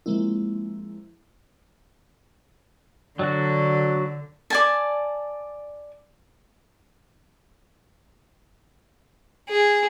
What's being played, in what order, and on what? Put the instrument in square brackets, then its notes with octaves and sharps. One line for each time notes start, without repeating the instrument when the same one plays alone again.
[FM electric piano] F3 G#3 A#3 C4 E4
[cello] D3 [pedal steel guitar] F#3 D4 F#4
[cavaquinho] D5 G#5 A5
[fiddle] G#4